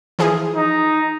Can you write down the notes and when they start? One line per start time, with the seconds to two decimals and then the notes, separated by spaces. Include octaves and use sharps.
0.19 E3 F3 G#4
0.56 D#4